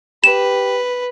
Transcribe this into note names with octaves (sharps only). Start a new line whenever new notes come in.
G4 B4 E7